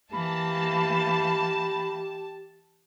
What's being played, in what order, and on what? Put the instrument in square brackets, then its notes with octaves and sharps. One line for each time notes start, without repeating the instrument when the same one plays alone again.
[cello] E3 A#3 [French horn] G4 [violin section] A5 [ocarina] B5